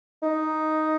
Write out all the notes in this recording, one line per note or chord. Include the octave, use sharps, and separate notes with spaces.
D#4